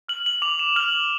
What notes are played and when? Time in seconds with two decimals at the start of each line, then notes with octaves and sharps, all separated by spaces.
0.09 F6 F#7
0.26 F#7
0.42 D6 F7
0.59 E7
0.76 F6 F#7